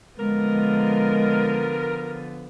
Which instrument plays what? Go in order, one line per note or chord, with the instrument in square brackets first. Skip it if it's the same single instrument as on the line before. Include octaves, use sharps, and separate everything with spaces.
[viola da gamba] D3 F3 B3 [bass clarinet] G#3 [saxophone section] A#4